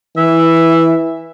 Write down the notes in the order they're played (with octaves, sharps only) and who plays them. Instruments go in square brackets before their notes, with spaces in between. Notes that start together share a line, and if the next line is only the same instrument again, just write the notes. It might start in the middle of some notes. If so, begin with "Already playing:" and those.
[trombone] E3 [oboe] E5